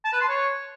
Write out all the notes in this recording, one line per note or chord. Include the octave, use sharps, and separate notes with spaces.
A5
B4
C6
C#5